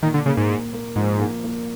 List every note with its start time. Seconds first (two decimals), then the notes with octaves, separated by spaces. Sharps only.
0.03 A#2 D#3
0.14 D3
0.26 C#3 A#3
0.37 G#2
0.49 A#3
0.73 A#3
0.96 G#2 F3
1.20 A#3
1.44 A#3